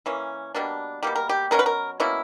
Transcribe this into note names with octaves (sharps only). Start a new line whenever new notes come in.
E3 A#3 C#4
B2 G3 A#3 D4
B2 G3 A#3 G4
A#4
G4
B2 F#3 C#4 A#4
B4
A#4
B2 A#3 C#4 E4